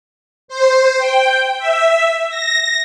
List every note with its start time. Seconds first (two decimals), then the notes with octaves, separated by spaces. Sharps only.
0.48 C5
0.98 G5
1.58 E5
2.29 A#6